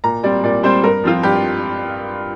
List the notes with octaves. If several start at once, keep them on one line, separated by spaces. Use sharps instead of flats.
A#2 A#5
G3 C4 D5
A#2 D5
G3 C4 C5
G2 A#4
F3 C4 F4
G2 G4